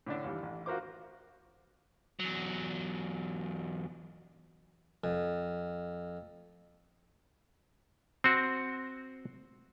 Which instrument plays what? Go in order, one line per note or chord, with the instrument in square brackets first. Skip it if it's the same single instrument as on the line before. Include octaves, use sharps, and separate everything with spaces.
[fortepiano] A2 D3 D4
D#2 E3 G3
A1
F4 F#4 A#4 C5 D6
[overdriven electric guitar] E2 F#3
[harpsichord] F2
[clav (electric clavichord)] C4 F#4